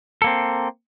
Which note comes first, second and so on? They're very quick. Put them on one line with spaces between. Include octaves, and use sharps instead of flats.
A4 A#3 C4